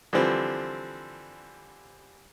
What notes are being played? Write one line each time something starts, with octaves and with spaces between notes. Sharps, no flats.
D3 E3 F3 G3 C4